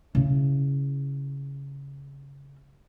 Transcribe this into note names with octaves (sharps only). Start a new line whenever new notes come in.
C#3 E4